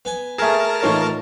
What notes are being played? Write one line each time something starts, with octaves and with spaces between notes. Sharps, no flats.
B3 G#5
A3 G#4 A#4 A5
A2 E3 A#3 D#4 F4 C#5